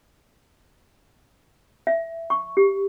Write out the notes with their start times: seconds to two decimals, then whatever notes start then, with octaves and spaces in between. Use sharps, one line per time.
1.87 E5
2.30 C#6
2.57 G4